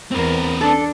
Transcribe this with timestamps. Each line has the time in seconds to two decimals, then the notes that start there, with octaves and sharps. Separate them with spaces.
0.12 E2 C4 A#4 B4
0.61 D4 A4